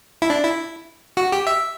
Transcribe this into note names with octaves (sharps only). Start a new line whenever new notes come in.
E4
D4
E4
F#4
G4
E5